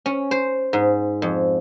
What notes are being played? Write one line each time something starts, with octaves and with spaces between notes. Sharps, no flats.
C#4
C5
G#2
F2